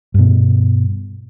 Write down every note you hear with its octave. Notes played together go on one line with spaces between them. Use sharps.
G2 B2